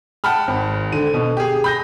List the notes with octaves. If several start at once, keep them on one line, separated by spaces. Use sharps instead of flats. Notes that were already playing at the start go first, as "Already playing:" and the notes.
F#5 G5 A5 B5 F6
G#1
D3 D#7
B2 D3
G4 G#4
B5 G6 A#6